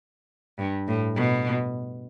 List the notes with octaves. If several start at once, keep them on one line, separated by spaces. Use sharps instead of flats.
G2
A2
B2